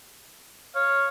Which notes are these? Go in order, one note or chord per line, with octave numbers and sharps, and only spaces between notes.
C#5 F5